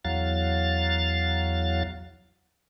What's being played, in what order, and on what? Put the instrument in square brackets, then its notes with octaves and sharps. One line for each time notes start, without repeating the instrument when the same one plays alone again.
[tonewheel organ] E2 F#3 F5 A6